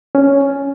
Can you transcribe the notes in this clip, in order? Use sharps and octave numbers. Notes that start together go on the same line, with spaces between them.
C#4